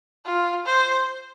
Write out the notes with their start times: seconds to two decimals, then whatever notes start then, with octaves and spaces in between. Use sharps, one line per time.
0.25 F4
0.65 C5